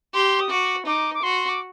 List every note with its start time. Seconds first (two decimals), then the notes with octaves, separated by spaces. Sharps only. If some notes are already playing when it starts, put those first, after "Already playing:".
0.14 G4 C6
0.40 D#6
0.50 F#4 D6
0.86 D#4 D6
1.14 D6
1.23 F#4 C6
1.49 D6